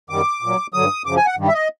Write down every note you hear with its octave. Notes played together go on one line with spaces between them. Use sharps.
F#2 D#3 G3 D6
A#2 F#3
G2 D3 F#3 D#6
F#2 C#3 F3 D6
G#5
F#5
G2 D#3 G3
E5
D#5